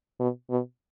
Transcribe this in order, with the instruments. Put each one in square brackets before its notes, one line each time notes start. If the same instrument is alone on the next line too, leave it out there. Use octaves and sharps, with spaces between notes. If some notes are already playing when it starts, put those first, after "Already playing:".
[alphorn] B2
B2